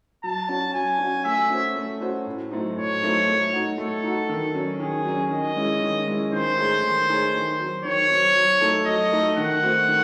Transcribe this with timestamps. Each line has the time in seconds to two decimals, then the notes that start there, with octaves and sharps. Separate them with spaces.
0.24 F#3 A5
0.49 C#4 F#4
0.73 F#3 G#5
0.99 C#4 F#4
1.24 A3 E5
1.50 C#4 F#4 C5
1.76 A3
2.01 C#4 F#4 C5
2.26 A2
2.51 F#3 A3 C4 D#4
2.76 A2 C#5
3.03 F#3 A3 C4 D#4
3.28 A3
3.53 D#4 F#4
3.78 A3 A4
4.04 D#4 F#4
4.29 D#3
4.55 F#3 C#4
4.79 D#3 G#4
5.05 F#3 C#4
5.30 D#3 D#5
5.56 G#3 C#4 E4
5.81 D#3
6.08 G#3 C#4 E4
6.33 D#3 C5
6.58 A3 D#4 G#4 C#5
6.83 D#3
7.08 A3 D#4 G#4 C#5
7.34 D#3
7.59 F#3 C4
7.84 D#3 C#5
8.10 F#3 C4
8.35 F#3
8.61 A3 D#4 A4
8.85 F#3 D#5
9.12 A3 D#4 A4
9.36 D#3 F#5
9.62 A3 C4 F#4
9.88 D#3